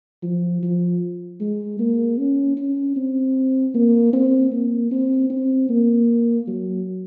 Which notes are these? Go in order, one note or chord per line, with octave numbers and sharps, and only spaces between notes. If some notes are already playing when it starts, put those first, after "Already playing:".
F3
F3
G#3
A#3
C#4
C#4
C4
A#3
C4
A#3
C4
C4
A#3
F#3